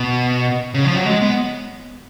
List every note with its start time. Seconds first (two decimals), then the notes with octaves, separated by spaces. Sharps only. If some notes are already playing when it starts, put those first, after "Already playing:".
Already playing: B2
0.74 C#3
0.85 F3
0.96 F#3
1.06 G#3
1.21 B3